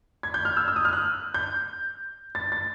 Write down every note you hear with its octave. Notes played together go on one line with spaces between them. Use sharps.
G#6
G6
F6
E6
E6
D#6
F6
F#6
G6
A6
A6